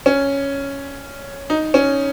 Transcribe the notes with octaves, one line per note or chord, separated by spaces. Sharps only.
C#4
D#4
C#4